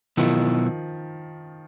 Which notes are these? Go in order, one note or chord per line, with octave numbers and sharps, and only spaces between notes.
B2 D#3 F3 F#3 B3 E4